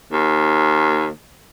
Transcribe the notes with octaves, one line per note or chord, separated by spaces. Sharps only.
D#2